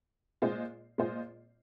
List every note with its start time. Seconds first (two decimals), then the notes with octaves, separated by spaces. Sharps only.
0.42 A#2 G#3 F4 C5 D#5
0.98 A#2 G#3 F4 C5 D#5